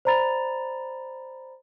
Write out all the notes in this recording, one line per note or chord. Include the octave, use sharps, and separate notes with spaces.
C5 D5 A#5 B5 A6 F7